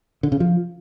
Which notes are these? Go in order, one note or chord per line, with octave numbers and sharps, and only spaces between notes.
D3
C#3
F3